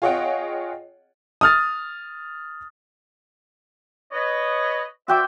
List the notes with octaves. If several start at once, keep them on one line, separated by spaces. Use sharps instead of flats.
F4 G#4 C#5 D#5 F#5 G5
D#6 F6 A6
B4 C#5 D#5
F#4 C5 D5 E5 G5 D6